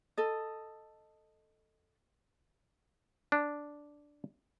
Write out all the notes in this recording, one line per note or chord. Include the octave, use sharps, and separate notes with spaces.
A4 D#5
D4